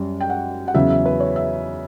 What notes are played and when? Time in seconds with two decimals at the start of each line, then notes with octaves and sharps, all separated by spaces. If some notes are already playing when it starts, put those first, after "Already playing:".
Already playing: F#2 G3
0.21 G5
0.30 F#5
0.68 F#5
0.74 E2 C#3 F#3 E5
0.90 E5
1.06 B4
1.20 C#5
1.36 E5